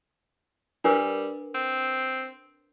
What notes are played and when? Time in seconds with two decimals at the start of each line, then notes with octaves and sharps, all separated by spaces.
0.84 G3 D4 A#4 B4
1.55 C4